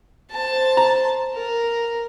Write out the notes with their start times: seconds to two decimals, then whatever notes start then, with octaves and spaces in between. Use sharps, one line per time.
0.31 C5 A5
0.77 A#5
1.34 A#4